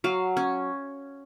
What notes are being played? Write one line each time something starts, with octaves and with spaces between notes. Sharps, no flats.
F#3 F5
C#4